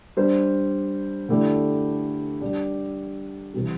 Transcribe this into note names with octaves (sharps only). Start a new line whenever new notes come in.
G3 D4 C5
D3 A3 E4 G4 D5
G3 D4 G4 D5
C3 E3 G3